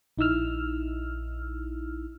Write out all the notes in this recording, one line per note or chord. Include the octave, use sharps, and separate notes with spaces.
A#1 D#4 E4 E6 F6